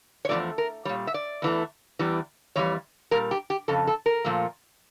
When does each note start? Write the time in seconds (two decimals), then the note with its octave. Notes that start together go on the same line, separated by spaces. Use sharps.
0.25 C#5
0.29 E2 C#3 F3 A3 D5
0.58 A#4
0.85 A#2 G3 C#5
1.07 E5
1.14 D5
1.42 E2 E3 A3
1.99 E2 E3 G3
2.56 F2 E3 G3 C#5
3.11 A#2 G3 A#4
3.31 G4
3.50 G4
3.68 F2 C#3 A4
3.87 A4
4.06 A#4
4.25 A#2 F3 A3